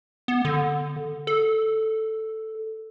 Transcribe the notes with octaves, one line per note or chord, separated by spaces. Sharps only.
B3
D3
A4